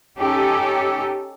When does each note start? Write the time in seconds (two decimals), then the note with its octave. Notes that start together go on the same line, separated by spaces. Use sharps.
0.17 C#4 D#4 G4 A4